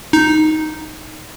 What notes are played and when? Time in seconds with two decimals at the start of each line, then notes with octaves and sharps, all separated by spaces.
0.13 D#4